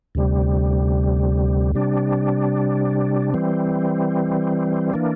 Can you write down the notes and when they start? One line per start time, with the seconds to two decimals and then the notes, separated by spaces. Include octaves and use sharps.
0.15 D2 C3 G3
1.75 C3 G3 D4
3.34 E3 G3 C4
4.93 E3 A#3 D4